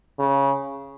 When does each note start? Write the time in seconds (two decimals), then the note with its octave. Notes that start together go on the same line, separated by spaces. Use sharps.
0.19 C#3